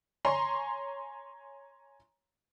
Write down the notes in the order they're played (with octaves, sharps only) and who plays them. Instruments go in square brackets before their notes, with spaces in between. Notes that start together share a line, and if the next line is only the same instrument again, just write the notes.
[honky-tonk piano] C#5 G#5 A#5 C6